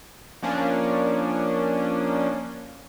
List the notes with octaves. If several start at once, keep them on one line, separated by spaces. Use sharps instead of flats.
F3 A#3 C#4 D4